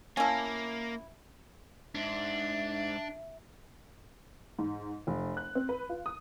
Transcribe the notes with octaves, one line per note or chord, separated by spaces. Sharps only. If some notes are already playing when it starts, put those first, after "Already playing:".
A#3 C#4 E4 F5 G#5 A5
G#2 D4 E5
G#2
F1
F#6
C4
B4
F4
D#6